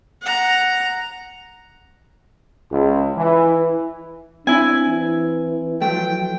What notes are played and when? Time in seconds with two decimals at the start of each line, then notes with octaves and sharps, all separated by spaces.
0.22 F#5 A#5
2.72 C#2
3.17 E3
4.47 C4 D4 E4 G#5
4.88 E3
5.82 F3 F#3 A3 G5